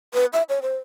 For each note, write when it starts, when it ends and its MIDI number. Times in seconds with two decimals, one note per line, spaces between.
0.14 0.26 71
0.33 0.43 76
0.49 0.59 73
0.62 0.77 72